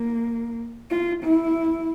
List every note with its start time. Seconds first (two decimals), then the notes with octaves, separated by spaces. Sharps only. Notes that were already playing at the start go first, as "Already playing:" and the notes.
Already playing: A#3
0.90 F4
1.23 E4